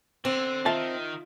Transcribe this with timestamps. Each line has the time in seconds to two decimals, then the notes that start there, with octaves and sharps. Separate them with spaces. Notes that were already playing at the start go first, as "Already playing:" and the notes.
0.25 D3 C4
0.66 D#3 F4 E5 A5